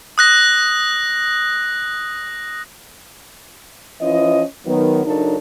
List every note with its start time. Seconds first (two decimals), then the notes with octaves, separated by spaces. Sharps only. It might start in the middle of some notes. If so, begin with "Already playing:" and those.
0.18 D#6 F#6 A#6
4.00 E3 F3 C#4 F4 D#5
4.65 D#3 F#3 B3
5.05 C#3 F#3 D4 D#4 A4 A#4